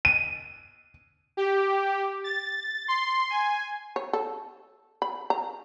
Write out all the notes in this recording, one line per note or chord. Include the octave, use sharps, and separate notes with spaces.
D#7
G4
A6
C6
G#5
C#5
A4
B5
A#5